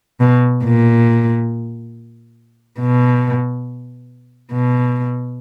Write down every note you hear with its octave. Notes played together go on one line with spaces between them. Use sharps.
B2
A#2
B2
B2